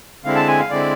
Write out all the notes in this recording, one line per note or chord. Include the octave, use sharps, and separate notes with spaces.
D3 G#3 C4 E4 F5
A5
G#5
F5
D3 G#3 C4 E4 D5